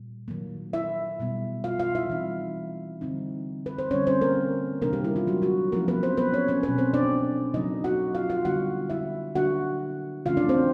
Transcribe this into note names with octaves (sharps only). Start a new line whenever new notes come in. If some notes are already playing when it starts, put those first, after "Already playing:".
Already playing: A#2 G3
D#3 F#3 A#3
E4 E5
B2 G3 B3
F4 F5
F4 F5
E4 E5
E3 G3 C4 D#4
D3 G3 C4 D#4
B4
C5
D3 G3 C4 C#4 C#5
C4 C5
A#3 A#4
C3 D#3 G3 A#3 B3 D4 A#4
G3 G4
E4
F4
F#3 F#4
F#3 F#4
F3 A3 A#3 C#4 E4 A#4
B3 B4
C4 C5
B3 B4
C#4 C#5
C#4 C#5
B2 F#3 B3 B4
C4 C5
D4 D5
C#3 F#3 A#3 D#4 D#5
F#4 F#5
F4 F5
F4 F5
D3 G3 B3 D4 F#4 F#5
E4 E5
D3 F#3 A#3 D4 F#4 F#5
C#3 E3 A3 C#4 F4 F5
D4 D5
C4 C5